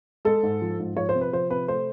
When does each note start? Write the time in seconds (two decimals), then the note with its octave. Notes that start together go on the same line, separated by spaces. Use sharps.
0.25 G#3 A4
0.43 G#2
0.62 F3
0.79 G#2
0.97 F3 C#5
1.09 C5
1.15 C3
1.21 B4
1.33 F3 C5
1.50 C3 B4
1.68 A3 C5